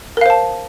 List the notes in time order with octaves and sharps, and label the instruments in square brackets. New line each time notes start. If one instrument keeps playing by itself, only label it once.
[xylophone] A#4
F5
C5
A5